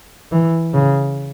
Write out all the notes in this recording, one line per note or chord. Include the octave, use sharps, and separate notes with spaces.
E3
C#3